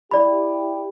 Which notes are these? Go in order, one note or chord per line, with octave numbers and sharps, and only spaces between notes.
E4 G4 D5 B5